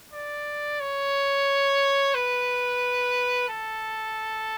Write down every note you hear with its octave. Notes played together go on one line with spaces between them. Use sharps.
D5
C#5
B4
A4